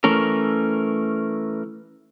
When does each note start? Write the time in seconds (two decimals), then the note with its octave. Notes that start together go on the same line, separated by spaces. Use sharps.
0.04 E3 A3 C#4 A#4